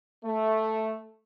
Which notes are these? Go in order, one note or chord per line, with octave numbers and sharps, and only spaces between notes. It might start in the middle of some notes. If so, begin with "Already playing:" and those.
A3